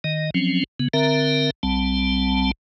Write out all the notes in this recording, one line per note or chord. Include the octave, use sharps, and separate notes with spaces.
D#3 D#5
F3 F#3 C4 C#4
C#3 B3
D3 C4 A#4 E5 A#5
B1 G3 C4 A5